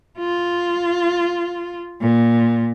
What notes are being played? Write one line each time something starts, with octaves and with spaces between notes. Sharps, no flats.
F4
A#2